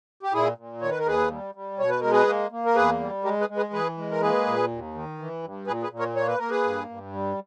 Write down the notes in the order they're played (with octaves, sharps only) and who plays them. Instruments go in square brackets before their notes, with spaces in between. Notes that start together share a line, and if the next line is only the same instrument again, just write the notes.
[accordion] G4
A#2 E4 G#4
A#2
D#3 C#5
B4
A#4
D#2 G#4 B4
G3
G3
B2 C#5
B4
G#3 A#4
G#4 B4
A#3
A#3
A#4
E2 G#4 B4
G3
G#3 G4 A#4
G#4 B4
G#3
G#4 B4
E3 G#4 B4
G#3
A#4
A#3 G#4 B4
A#2
D#2
D#3
E3
G2
A#2 G#4 B4
G#4 B4
A#2
A#4 C#5
A#3 C#5
B4
A#3 A#4
G#4 B4
G2
G2
G3